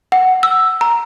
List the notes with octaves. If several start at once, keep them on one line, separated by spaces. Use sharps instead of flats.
F#5
E6
A#5